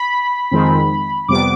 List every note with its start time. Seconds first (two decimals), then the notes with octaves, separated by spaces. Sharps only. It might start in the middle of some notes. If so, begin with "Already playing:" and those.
Already playing: B5
0.51 F2 D#3 G#3 C4
1.28 F2 C3 G3 B3 D6